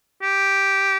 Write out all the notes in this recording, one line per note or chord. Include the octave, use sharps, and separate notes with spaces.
G4